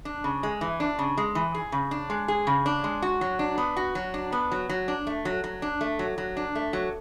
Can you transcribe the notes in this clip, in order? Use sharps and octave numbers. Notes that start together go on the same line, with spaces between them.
D4
C#3
G#3
E3
D4
C#3
G#3
E3
G#4
C#3
D4
G#3
G#4
C#3
D4
G#3
F#4
F#3
D4
B3
F#4
F#3
D4
B3
F#3
F#3
D4
A3
F#3
F#3
D4
A3
F#3
F#3
D4
A3
F#3